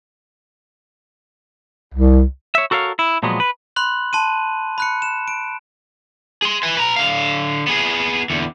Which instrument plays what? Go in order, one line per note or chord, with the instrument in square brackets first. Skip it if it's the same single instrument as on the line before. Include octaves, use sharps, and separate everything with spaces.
[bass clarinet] C2
[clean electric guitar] C#5 E5
F#4 A4 A#4 C#5 F5
E4
A#2 F3 F#3 G#3 B3
B4
[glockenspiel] B5 C6 F#6 F#7
A5 C6 D#7
B5 F#6 C#7
E7
D7
[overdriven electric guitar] G#4 C6
B4 G#5
B4 A#5
D3 F5
B3 G#4
E2 D3